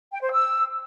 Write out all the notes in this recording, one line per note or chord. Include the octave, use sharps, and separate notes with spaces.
G5
C5
E6